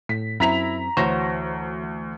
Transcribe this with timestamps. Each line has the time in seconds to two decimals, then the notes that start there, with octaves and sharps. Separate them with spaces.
0.09 A2 B6
0.40 F#2 C4 E4 A#5 B6 F7
0.97 D2 E3 F#4 C5 C#5 A#6